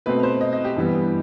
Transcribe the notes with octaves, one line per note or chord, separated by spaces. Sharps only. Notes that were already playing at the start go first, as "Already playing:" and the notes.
B2 A3 C4 B4
C5
D#5
D#5
G4
G2 E3 G3 B3